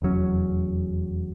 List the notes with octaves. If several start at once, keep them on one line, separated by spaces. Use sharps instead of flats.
F1 E2 F#3 C#4